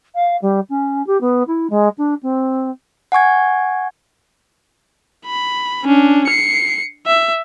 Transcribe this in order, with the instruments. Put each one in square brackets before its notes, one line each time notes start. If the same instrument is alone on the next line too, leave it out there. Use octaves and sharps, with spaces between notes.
[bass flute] F5
G3
C#4
G4
B3
E4
G#3
D4
C4
[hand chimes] F#5 G#5 C#6 G#6
[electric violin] B5
C#4 D4
C7 C#7
E5